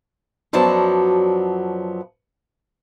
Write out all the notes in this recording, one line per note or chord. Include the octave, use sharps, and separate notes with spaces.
F#2 F3 F#3 B3 D5 A5